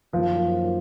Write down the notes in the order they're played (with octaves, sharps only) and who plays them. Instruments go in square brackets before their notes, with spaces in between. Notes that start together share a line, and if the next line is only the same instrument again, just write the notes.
[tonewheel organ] F#2 D#3 F#3 A#3 [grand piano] F3